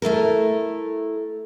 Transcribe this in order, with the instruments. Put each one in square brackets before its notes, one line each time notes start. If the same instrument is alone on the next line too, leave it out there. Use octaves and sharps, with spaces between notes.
[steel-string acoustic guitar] A3 E4 A4 A#4